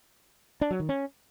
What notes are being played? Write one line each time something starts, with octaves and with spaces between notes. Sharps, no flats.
D4
F#3
D#3
C#4